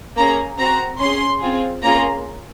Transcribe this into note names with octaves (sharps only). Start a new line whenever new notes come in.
A#3 C#4 G#4 A#5
C4 F#4 A#5
C#4 G#4 C6
C4 F4 G#4
A#3 C#4 F4 G#4 A#5